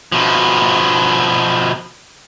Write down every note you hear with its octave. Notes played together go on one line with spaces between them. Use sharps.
B2 F3